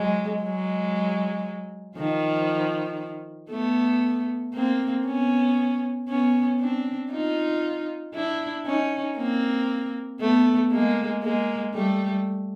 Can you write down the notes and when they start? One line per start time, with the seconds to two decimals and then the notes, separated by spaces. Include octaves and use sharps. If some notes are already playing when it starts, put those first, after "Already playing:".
Already playing: F#3 G#3
0.42 F#3 G#3
1.97 D#3 F3
3.51 A3 B3
4.54 A#3 C4
5.06 B3 C#4
6.09 B3 C#4
6.60 C4 D4
7.11 D#4 F4
8.14 D4 E4
8.66 C#4 D#4
9.17 A#3 C4
10.20 A3 B3
10.71 G#3 A#3
11.23 G#3 A#3
11.74 G3 A3